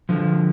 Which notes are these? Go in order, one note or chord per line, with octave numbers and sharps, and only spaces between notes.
D3 F3